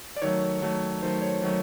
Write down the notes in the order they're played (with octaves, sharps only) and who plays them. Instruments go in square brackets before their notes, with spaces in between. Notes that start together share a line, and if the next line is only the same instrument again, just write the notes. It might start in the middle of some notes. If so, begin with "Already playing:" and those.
[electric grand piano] D5
D#3 F#3 A3 C#5
D#3 F#3 A3
D#3 F#3 A3 C5
C#5
D#3 F#3 A3